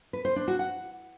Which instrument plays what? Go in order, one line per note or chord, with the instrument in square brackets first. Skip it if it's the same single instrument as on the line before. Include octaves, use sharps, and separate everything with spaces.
[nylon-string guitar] B4
C5
D4
F#4
F#5